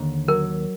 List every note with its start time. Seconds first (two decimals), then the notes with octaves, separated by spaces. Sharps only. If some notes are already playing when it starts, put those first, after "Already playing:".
Already playing: D#2 D3
0.28 F#3 A#4